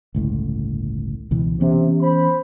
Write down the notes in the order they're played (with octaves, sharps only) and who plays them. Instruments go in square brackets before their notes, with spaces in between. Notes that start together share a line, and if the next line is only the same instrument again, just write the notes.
[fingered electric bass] G1 C#2 A2
C#2 B2 E3
[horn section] C3 [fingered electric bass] E3 B3 C#4
[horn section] C5 B5